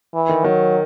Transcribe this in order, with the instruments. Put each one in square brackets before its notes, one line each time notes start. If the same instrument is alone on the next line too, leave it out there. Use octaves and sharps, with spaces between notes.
[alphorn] E3
[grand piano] D#3
[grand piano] D#3 [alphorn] F#3